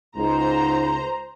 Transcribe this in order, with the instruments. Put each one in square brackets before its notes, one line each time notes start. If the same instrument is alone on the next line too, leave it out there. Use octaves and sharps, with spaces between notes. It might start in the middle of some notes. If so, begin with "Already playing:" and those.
[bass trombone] C#2 [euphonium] G#2 [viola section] C5 A#5